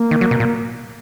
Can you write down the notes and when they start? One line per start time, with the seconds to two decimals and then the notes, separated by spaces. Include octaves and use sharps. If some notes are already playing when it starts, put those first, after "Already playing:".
Already playing: A#3
0.11 D#3
0.21 F#3
0.31 B2
0.40 A#2